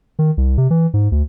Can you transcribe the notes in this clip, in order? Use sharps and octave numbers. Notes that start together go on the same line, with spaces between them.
D#3
C2
C3
E3
G#2
D2